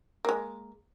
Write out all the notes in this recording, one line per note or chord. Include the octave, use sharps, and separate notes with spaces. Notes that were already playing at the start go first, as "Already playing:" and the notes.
G#3 A#3